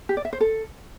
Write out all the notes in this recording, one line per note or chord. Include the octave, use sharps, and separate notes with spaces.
G4
D5
E5
C5
A4